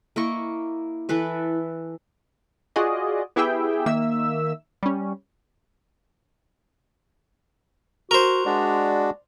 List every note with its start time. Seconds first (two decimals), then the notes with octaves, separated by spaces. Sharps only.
0.16 A#3 E4 D#5 C#6
1.09 E3 A4 B4 E5
2.76 F4 F#4 G#4 D5 D#5
3.36 B3 E4 G4 G#4 E5 G5
3.86 D#3 A#3 E5 E6
4.83 G3 C#4
8.11 F#4 A#4 C5
8.46 G#3 D4 F#4 D5